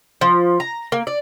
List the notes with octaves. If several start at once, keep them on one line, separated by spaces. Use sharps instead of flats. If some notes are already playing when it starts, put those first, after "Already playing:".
F3
A#5
A#3
D5